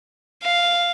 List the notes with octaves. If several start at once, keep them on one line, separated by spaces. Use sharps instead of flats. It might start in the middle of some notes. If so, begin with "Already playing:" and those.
F5